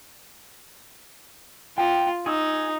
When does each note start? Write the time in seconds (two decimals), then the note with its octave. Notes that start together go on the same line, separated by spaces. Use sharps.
1.78 F4 G5 A#5
2.26 D#4 G#4 C#6 E6